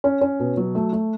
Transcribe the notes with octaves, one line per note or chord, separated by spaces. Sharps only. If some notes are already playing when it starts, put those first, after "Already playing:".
C#4
C#4
B2
F#3
A3
A3